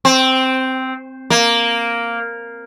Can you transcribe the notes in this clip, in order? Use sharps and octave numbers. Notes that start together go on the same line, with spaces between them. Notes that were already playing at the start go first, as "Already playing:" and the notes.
C4
A#3